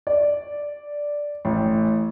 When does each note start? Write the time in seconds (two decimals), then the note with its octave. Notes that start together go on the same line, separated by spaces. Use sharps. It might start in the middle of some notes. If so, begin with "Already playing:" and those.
0.07 D5
1.45 A1